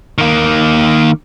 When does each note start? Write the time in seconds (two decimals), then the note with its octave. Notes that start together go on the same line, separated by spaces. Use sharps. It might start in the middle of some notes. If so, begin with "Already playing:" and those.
0.18 D#3 A#3